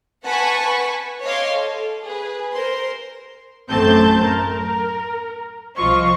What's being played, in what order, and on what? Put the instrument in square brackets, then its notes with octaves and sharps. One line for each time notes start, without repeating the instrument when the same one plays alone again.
[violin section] B4 F#5 G#5 A5 B5 C#6
C#5 D#5 F5 C6 D6
A4
G#4 B4
A#4 C5 C6
[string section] A1 F#2 A3 C4 A5 G6
A#4
C2 F3 F4 C5 D#5 C#6